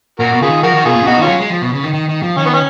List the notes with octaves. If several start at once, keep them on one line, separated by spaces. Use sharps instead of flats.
A#2 F#4 A#4
B2
C#3 F4 G#4
D#3
F3 F#4 A#4
D#3
B2 F4 G#4
A#2
C#3
B2 D#4 F#4
D#3 C#4 F4
F#3
G#3
F3
B2
C#3
D#3
D#3
D#3
F3
D#3 C#4
B3
C#4